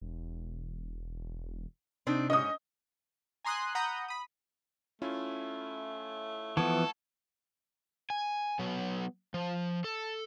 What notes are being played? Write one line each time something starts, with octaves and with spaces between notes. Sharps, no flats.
E1
C3 C4 D4 D#4
G#2 C#4 D#5 D#6
G#5 A#5 C6 D#6 F#6
F#5 A#5 B5 D#6 G6
B5 D#6
A3 C#4 E4 F4
E3 F3 B3 A4 F#5 C#6 G#6
G#5
F#3 B3
F3
A4